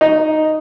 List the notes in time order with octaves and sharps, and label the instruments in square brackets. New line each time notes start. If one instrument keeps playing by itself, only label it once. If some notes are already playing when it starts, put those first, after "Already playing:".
[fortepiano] D#4